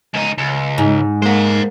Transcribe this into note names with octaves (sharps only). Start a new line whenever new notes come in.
C#2 D#4
C#2
G#2
G#3 A#3 C5 F#5